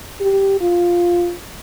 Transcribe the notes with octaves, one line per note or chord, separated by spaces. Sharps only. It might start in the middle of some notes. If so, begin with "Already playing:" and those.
G4
F4